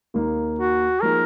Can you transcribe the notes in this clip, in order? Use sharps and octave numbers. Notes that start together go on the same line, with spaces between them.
D#2 D#3 A#3 D#4
F#4
F3 A#3 D#4 G#4 A#4